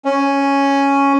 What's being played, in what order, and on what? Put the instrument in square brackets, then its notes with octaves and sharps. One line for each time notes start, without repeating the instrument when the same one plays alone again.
[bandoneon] C#4